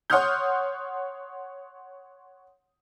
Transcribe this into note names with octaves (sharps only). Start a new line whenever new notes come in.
C#5 F#5 C6 D#6 F6 G6